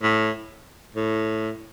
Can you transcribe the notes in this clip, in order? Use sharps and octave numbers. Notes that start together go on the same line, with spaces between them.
A2
A2